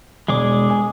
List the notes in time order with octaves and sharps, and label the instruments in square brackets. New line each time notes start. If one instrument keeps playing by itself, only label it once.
[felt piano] E1 [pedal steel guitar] G#3 G#4 D6
[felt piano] G#5